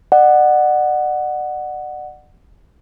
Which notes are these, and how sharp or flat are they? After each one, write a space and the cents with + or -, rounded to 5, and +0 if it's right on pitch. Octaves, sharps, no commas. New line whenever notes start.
D5 +40 F#5 +0